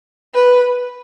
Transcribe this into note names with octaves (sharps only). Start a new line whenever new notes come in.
B4